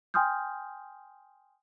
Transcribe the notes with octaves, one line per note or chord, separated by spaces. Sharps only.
G5 G#5 C6 D#6 F6 G6